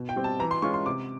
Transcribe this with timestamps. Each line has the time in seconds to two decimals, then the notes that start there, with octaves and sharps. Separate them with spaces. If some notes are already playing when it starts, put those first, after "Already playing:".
Already playing: B2
0.09 G5
0.16 G3 C4
0.24 A5
0.39 E3 A#5
0.51 C6
0.62 G#3 C#4 F4 C#6
0.74 C6
0.86 C3 D6